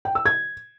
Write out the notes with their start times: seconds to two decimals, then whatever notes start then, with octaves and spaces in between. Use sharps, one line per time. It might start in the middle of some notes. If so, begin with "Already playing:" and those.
0.05 G5
0.15 E6
0.26 G#6